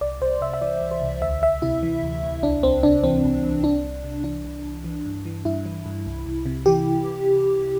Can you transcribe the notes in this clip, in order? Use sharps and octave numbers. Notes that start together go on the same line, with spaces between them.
C2 D5
C2 C5
C3 E5
E5
E3 D5
C2
C5
C2
D2 E5
D2 E5
C3 E4
E3
D2
D2
C2 D4
C2 C4
C3 D4
E3 C4
C2
C2
C2 D4
C2
C3
E3 D4
C2
C2
E3
G2
E3
G2 E4
E3
G2
C2
C2
C3
E3 G4